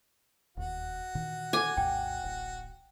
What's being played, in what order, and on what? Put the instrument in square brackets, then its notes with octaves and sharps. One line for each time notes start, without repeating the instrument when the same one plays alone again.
[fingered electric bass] E1 D#2 [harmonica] F#4
[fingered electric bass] A#2 D#3 E3
[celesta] A4 D6 G#6 [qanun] G#5
[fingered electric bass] A#1 E2 A2 [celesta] G5
[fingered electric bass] D1 A1